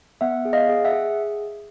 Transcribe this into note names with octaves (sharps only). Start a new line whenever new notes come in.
B3 E5 F#5
G#4
D#5 F5
G#4
E5 F#5
G#4